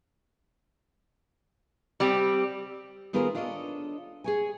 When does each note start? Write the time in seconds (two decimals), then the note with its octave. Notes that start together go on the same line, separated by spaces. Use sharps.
2.00 G3 C4 G4
3.13 D#3 B3 F4 G#4 A#4 C5
3.35 D4 F4 A4 C#5 D#5
4.24 G#4 C#5 G#5